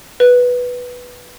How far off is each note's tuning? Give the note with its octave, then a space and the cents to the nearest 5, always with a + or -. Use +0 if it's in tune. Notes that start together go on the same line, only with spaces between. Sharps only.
B4 -5